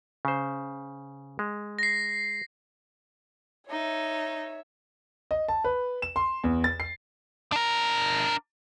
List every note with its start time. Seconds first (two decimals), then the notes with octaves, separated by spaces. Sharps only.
0.25 C#3 C5
1.39 G#3
1.79 A#6 C7
3.69 D#4 C#5 E5
5.31 D#5
5.48 A5
5.64 B4
6.02 E7
6.16 C6
6.44 E2
6.64 A6
6.80 C7
7.52 D4 A#4